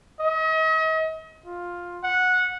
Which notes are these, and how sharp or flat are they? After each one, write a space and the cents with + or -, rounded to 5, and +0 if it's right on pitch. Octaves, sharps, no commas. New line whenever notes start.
D#5 +40
F4 +10
F#5 -15